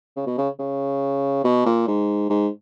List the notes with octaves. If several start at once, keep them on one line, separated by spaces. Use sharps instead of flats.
C#3
B2
C#3
C#3
B2
A#2
G#2
G#2